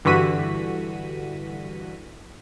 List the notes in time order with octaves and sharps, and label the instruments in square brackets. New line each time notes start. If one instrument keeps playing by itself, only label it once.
[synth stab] G2 D3 E3 F#4 B6 D#7